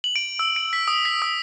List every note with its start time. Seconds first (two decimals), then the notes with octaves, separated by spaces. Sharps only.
0.04 F#7
0.16 D7
0.39 E6
0.56 D7
0.73 B6
0.88 D#6
1.05 B6
1.22 D#6